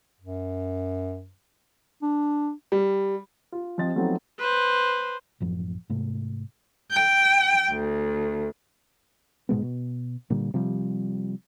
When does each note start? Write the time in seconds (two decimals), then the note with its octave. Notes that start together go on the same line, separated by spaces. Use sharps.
0.20 F#2
2.02 D4
2.72 G3
3.52 F4
3.78 F3 C4 D#5 A6
3.96 F3 F#3 A3 B3 C4 D#4
4.39 B4 C5
5.40 A1 F#2 F3
5.90 G#2 C3 A3
6.91 G5
7.71 D2
9.49 G#2 B2 G#3 B3
9.62 B2
10.30 A#2 D3 G3
10.54 C3 F3 G3